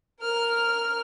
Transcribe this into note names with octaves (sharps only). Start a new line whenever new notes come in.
A#4 F6